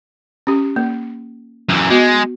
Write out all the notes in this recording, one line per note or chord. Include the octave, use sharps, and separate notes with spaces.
C#4 G4
A#3
F#2 E3
G#3 B3 F#4